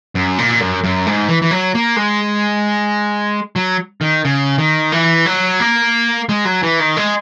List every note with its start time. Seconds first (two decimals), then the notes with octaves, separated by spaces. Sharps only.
0.15 F#2
0.38 A#2
0.61 F#2
0.84 F#2
1.06 G#2
1.28 E3
1.42 E3
1.51 F#3
1.75 A#3
1.96 G#3
3.56 F#3
4.01 D#3
4.25 C#3
4.58 D#3
4.92 E3
5.26 F#3
5.60 A#3
6.29 G#3
6.45 F#3
6.63 E3
6.79 D#3
6.97 G#3